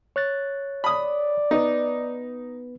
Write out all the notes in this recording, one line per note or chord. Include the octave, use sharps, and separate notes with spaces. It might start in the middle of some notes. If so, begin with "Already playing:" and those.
C#5 F#6 A6
D5 B5 D#6
B3 D#4 B4